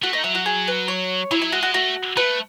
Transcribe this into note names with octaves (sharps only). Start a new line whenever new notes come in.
A3 F#4
D#4
F#3 E4
F#4
G#4
B4
C#5
F#3 E4
E4
G#3 F#4
F#4
A3 F#4
A3 B4